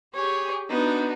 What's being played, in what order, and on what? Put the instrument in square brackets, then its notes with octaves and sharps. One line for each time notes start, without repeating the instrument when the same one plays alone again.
[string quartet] G4 G#4 [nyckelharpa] C#5
[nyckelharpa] B3 [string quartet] D4 D#4 F#4